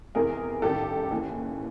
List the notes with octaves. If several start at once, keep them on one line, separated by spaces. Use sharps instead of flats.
F1 E2 C3 E3 G#4 A#4
A1 G2 D#3 G4 A4
D#2 C#3 E3